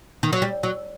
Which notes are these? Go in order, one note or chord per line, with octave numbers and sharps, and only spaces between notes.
D#3
F#3
G3
F#3